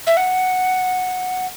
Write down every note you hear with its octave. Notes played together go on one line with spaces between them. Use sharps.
E5
F#5